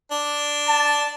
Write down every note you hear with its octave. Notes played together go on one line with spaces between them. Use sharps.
D4
A5